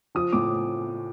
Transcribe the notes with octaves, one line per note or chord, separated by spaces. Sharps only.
F3 D#6
A2 D6